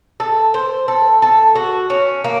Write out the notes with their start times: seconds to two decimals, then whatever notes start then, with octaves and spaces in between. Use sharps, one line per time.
0.20 A4
0.54 C5
0.88 A4
1.22 A4
1.56 F#4
1.90 C#4
2.24 A#3